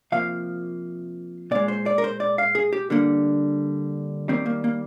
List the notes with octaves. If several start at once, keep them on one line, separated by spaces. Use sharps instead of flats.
C3 F3 A#3 F5
A#2 G#3 D5
C5
D5
A#4
C5
D5
F5
G#4
G4
D3 G3 A#3
D#3 G3 A#3 C4
A#3
A#3